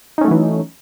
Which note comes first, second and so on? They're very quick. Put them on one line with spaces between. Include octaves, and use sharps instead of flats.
D#4 C#4 A3 F#3 E3